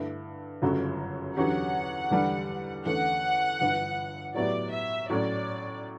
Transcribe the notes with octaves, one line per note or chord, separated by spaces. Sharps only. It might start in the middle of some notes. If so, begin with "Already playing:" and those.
Already playing: G2 D3 A3 E4
G1 F#2 C#3 F#3 A3
E2 D3 F#3 C#4 G4 F#5
E2 D3 G3 D4 G4
E2 D3 A3 C#4 F#5
G1 G2 E3
A2 F#3 B3 E4 G4 D5
E5
A2 F#3 A3 C#4 D5